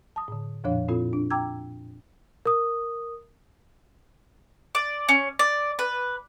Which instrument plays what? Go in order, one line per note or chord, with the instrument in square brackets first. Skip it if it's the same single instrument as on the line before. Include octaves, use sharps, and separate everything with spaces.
[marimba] A5 D#6
A2 D3
F2 A#2 F3 D4 C#5 F5
A#2 C4 E4 F4 A4
D4
G5 A#5 D6 E6 G#6
[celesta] A#4 D#6
[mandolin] D5
C#4
D5
B4